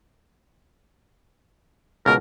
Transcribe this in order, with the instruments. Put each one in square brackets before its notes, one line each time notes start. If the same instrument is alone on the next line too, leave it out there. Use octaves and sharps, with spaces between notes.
[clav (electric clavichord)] C#2 B2 [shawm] A#4